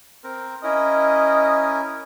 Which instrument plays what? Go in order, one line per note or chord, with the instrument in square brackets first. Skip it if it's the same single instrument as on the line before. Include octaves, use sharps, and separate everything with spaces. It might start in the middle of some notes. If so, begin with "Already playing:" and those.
[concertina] C4 A#4
[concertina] C#4 E4 A#4 [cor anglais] D#5